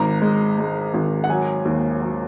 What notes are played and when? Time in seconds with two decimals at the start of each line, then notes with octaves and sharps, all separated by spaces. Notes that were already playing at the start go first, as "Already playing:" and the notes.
Already playing: G#1 A#5
0.22 G#3
0.58 G#3
0.94 G#1
1.24 F#5
1.29 F#3 G#5
1.65 D#2
2.01 F#3